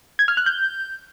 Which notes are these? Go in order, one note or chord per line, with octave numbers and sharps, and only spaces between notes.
G#6
F6
F#6
G6